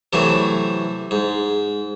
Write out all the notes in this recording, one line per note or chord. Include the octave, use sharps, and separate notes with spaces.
C3 E3 F#3 A3
G#2